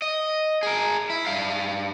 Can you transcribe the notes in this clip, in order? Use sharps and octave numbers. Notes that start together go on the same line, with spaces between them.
D#5
G#4 A#4
E4
G2 F5